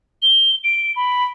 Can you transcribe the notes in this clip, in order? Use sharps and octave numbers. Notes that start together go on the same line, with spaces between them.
G7
D7
B5